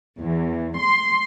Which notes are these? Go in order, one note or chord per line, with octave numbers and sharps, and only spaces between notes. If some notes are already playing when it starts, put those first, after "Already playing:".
E2
C6